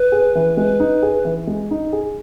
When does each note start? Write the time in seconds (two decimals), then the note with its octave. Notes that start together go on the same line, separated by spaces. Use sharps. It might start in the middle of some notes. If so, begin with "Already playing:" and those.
Already playing: B4
0.12 G#4
0.35 E3
0.57 G#3
0.80 D#4
1.02 G#4
1.25 E3
1.47 G#3
1.71 D#4
1.93 G#4